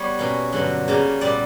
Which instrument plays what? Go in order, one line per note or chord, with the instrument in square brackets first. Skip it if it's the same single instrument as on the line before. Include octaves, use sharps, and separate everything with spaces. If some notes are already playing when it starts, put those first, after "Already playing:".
Already playing: [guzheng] G3 B3 C#5
B2 A#3 C#4
G2 D3 F#3
C#3 G3 A#3
A#2 G3 B3 D5